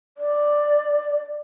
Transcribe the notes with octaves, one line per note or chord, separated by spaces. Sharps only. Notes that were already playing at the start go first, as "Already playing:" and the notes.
D5